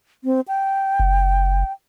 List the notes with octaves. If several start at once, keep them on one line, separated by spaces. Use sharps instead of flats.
C4
G5
F#1